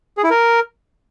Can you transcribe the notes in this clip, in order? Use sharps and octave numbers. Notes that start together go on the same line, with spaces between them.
G#4
E4
A#4